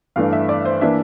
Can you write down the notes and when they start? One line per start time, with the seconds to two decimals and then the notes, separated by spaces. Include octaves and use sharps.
0.16 G2 E3 A3 D4 F5
0.33 E5
0.49 D5
0.65 C5
0.81 E3 A#3 D4 E5